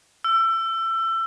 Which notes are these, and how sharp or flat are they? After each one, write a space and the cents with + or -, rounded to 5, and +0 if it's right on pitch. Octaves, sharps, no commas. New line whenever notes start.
E6 +25